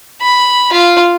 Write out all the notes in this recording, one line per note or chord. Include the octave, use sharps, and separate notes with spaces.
B5
F4